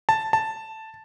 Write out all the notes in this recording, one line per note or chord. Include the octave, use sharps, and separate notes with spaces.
A5
A5